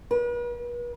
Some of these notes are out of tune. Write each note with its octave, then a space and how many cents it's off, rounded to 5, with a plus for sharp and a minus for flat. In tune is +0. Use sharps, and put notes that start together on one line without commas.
B4 -40